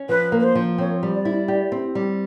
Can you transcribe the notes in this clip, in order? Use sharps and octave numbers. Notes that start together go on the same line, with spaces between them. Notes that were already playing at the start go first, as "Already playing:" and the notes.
Already playing: C#4
F3 B4
A#3
B4
C5
F3
C4 C#5
G3
D5
E4
G4
C4
G3